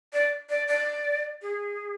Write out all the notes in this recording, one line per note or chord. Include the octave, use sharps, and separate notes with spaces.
D5
D5
D5
G#4